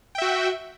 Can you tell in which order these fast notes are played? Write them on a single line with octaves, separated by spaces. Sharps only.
G5 E5 F#4